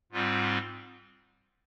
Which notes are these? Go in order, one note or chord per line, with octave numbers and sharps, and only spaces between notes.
G#2 G3 C4 F4